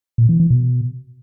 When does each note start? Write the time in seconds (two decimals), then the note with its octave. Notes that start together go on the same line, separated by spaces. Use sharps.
0.18 A#2
0.29 E3
0.40 E3
0.51 B2